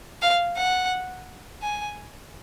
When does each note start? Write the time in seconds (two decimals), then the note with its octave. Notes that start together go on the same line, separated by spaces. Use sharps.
0.22 F5
0.56 F#5
1.63 G#5